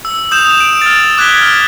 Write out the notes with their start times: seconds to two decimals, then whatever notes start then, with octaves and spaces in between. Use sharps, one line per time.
0.05 E6
0.31 D#6 G6 E7 F7
0.60 D7
0.82 F6 A6
1.18 D6 F#6 G#6 B6 G7
1.42 F6